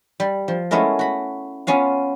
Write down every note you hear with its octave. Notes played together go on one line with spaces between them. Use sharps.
G3
F3
G#3 A3 B3 C#4 E4 A#4
F#4 B5
B3 C#4 F4 F5